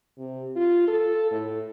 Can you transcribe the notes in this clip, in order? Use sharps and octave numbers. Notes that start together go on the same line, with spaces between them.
C3
F4
A4
A2